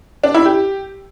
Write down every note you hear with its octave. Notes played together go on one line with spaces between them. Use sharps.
D4
E4
G4